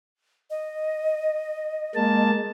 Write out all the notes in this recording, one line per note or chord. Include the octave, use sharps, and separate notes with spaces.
D#5
G#3 A#3 A5